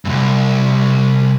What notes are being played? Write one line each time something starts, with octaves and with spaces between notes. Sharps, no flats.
C2 G2